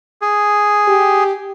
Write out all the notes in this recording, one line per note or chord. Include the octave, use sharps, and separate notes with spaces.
G#4
G4